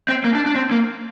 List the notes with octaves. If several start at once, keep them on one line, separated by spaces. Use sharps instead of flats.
C4
A#3
D4
D4
C4
A#3